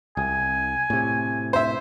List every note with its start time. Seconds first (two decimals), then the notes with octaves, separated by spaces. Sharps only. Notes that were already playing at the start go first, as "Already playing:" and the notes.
0.17 C2 G#5
0.90 A2 C3
1.53 C5 E5